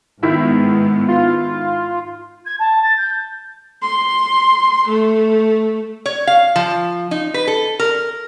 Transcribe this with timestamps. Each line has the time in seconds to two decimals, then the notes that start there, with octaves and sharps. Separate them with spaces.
0.23 G#2 D#3 B3 E4 E5
1.08 F4
2.45 G#6
2.59 A5
2.82 A6
2.97 G6
3.82 C6
4.89 A3
6.06 C#5
6.27 F5
6.56 F3
7.11 D#4
7.34 B4
7.47 A4
7.79 A#4